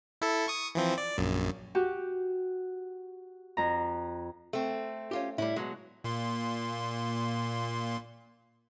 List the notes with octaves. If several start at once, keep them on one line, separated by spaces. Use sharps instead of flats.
E4 A4
C#6 D#6
E3 F3 C4
D5
A#1 F#2
F#4 G4
F2 A#5
A3 C4
C#4 F4 G4
A2 G3 E4
B2 F#3 G#3
A#2 A#3 C6